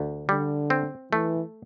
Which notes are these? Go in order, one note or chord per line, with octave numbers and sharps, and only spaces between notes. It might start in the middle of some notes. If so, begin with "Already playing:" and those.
Already playing: D2
D3 G3
C4
E3 A3